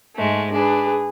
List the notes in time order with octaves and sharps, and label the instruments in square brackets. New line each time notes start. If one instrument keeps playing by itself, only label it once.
[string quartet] G#2 G#3 A3
[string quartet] D4 B4 [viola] G#4